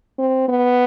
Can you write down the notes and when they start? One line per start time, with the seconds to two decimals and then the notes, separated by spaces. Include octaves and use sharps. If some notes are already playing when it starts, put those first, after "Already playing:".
0.19 C4
0.48 B3